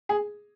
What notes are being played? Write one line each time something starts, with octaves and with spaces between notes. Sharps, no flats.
G#4